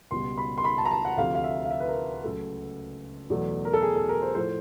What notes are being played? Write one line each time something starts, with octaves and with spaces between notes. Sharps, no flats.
C#2 B2 G3 C6
B5
C6
B5
A5
A#5
A5
F#5
D2 C3 F3 F5
F5
E5
F5
E5
B4
A#4
C#2 C#3 F#3 A3 A4
E2 B2 F#3 A3
A#4
A4
G#4
A4
A#4
C5
A2 F3 A3 C5